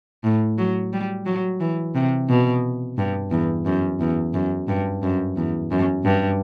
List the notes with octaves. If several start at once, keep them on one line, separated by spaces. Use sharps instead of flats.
A2
F#3
G3
F#3
E3
C3
B2
G2
E2
F#2
E2
F#2
G2
F#2
E2
F#2
G2